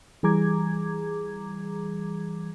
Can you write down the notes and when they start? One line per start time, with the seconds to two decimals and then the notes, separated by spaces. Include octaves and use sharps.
0.23 E3 G3 G#4 A#5 D6 G#6